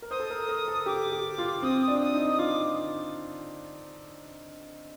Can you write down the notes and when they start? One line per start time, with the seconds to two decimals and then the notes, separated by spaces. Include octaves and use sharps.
0.02 A#4
0.11 C5 D#6
0.20 A4
0.30 A#4
0.49 A#4
0.68 A4
0.86 G4 D6
1.12 G4
1.38 F4
1.62 C4 D#6
1.81 D#6
1.88 D4
2.01 D#6
2.14 D#4
2.32 D#6
2.39 F4 D6